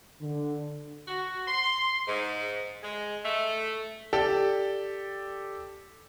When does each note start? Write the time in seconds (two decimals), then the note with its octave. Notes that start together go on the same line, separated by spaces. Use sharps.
0.21 D3
1.08 F#4
1.47 C6
2.07 G#2
2.83 G#3
3.25 A3
4.13 G4 A4 D5